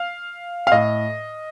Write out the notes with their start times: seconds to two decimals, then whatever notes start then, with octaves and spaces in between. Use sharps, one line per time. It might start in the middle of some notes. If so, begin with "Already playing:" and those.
Already playing: F5
0.67 F5
0.72 A2 D#5